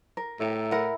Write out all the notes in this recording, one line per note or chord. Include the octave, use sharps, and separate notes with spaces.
A#4
A2 E5 G5 A#5
E4 A#4 F#5